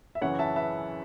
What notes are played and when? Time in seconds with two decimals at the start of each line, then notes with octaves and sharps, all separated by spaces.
0.15 E5
0.21 F#2 C#3 E3 C#5 F#5
0.39 E5 A5
0.56 B4 E5